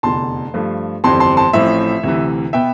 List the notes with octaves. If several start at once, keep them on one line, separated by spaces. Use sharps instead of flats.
F1 E2 D3 A5 C6
G2 F3 A3
G1 F2 E3 G3 C4 A5 C6
A5 C6
A5 C6
A1 A2 F3 C4 E5
D2 C3 E3
B2 B3 E5 G5